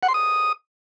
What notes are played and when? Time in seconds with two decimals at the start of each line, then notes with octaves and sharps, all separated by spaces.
0.03 F#5
0.08 C6
0.14 D#6